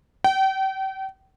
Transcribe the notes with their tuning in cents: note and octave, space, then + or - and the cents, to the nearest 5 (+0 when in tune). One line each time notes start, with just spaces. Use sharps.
G5 -35